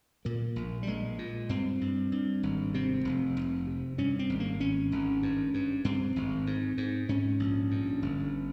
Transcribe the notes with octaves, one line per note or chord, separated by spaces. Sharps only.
A#2 A#3
A#1
G3
A#1 G#3
A#2
G2 C4
G2
G2
G#1
C3 C4
F1
F1
C3
G2 C#4
C4
G#1
A#3
G#1 C#4
G#1
G2
G2
G2 C4
G#1
G#2
G#2
G#2 C#4
A#1
G2
G1